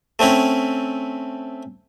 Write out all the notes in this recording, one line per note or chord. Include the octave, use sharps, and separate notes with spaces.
A3 C4 C#4 E4